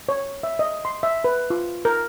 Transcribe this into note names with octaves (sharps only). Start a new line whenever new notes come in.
C#5
E5
D#5
C6
E5
B4
F4
A#4